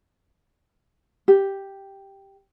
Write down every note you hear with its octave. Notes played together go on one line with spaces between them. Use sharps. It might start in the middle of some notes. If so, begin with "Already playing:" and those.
G4